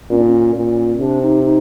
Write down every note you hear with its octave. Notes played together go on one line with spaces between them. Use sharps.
A#2 C#4
D4
C#4
A#2
C3 D4
D#4
D#4